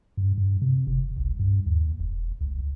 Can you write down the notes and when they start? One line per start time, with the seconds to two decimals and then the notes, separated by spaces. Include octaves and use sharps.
0.17 G2
0.38 G2
0.62 C3
0.87 F1
1.18 C2
1.39 G2
1.66 D#2
2.00 E1
2.41 C#2